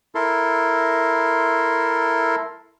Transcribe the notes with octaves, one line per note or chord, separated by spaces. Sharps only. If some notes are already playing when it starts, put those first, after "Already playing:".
E4 A4 A#4 C6